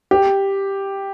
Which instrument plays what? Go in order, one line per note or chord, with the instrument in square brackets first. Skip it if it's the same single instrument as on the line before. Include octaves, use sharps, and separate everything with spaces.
[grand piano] G4